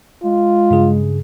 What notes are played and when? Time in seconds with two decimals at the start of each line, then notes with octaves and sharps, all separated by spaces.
0.23 G#3 F4
0.71 G2 C#3 G#4